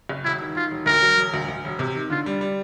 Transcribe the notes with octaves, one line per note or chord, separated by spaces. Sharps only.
F#1
E1 E4
D#3
D#3 F4
E1
D2 A#4
F#3
E1
D2
D2
E1
C3
D#3
D3 F4
G3
G3